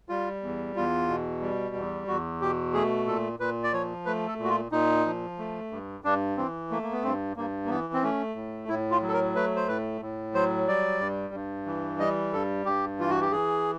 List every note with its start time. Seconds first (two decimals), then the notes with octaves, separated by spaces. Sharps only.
0.09 G3 F4
0.42 E2
0.76 E2 F4
1.08 B2
1.41 G3
1.75 E2
2.08 E2 F#4
2.41 B2 G4
2.73 A3 G#4
3.06 A#2 A4
3.39 A#2 B4
3.64 D5
3.73 F3 C#5
4.06 A3 B4
4.28 A4
4.39 A#2
4.44 F#4
4.50 F4
4.72 A#2 D#4
5.06 F3
5.39 A3
5.71 G2
6.04 G2 D4
6.37 E3 C4
6.71 A3 A#3
6.83 A#3
6.93 B3
7.03 G2 C4
7.36 G2 A#3
7.65 A#3
7.70 E3 B3
7.93 C4
8.02 A3 C#4
8.36 A2
8.68 A2 E4
8.91 F4
9.02 F#3
9.08 A4
9.13 A#4
9.35 A3 B4
9.56 C5
9.68 A2 B4
10.01 A2
10.34 F#3 C5
10.67 G3 D5
11.01 G2
11.34 G2
11.66 E3
12.00 G3 D#5
12.33 G2 A4
12.65 G2 G4
12.99 E3 F4
13.10 F#4
13.21 G4
13.32 E3 G#4